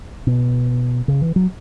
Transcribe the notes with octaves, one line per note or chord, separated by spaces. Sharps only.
B2
C#3
E3
F#3